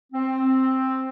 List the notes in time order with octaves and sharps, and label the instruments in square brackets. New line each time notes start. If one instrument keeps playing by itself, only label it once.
[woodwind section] C4